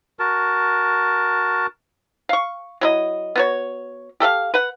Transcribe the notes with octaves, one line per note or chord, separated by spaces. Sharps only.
F#4 A#4 A5
F5 C#6
F#3 E4 D#5
B3 F#4 C#5
G4 A4 E5 F5
B4 F#5